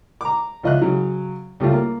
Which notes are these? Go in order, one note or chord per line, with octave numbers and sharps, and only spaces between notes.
A#5 D6
C#2 F3 D#5 E5 F#6
C#3 F#3
C#2 G3 A3 F4
A#3